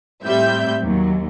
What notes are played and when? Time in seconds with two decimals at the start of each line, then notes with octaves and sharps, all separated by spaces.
0.24 A2 G3 C4 E5 G6
0.82 D#2 F#3